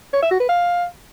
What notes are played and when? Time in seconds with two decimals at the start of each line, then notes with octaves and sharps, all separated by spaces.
0.13 C#5
0.22 E5
0.31 F#4
0.40 B4
0.49 F5